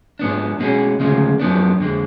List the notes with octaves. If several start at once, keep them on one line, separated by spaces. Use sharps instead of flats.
G#2 F3 B3 D4
B2 G#3 C#4
D2 C#3 F3 G#3
F#2 F3 B3 D4
F2 D3 G#3